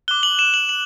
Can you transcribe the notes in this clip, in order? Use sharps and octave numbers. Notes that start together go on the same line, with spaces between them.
D6 F#6 G7
F#7
E7
F#7
F#7